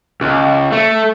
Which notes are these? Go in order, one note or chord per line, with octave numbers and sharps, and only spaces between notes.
C#2
A3